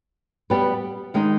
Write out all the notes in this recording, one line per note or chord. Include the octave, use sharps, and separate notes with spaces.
G3 B3 G4 B4
D#3 G#3 D#4